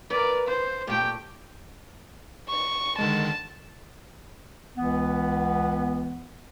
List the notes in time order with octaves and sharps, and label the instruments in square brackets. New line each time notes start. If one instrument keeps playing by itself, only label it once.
[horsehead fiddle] A#4 D5 [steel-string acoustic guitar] B4
[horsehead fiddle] C5
[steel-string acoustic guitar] A#2 A3 [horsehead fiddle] G4 G5
[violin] C#6
[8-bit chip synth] D3 D#3 G#3 [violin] A5
[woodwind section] C#2 E3 B3